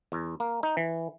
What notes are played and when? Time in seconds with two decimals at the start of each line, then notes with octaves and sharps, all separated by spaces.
0.12 E2
0.40 A#3
0.63 D#4
0.77 E3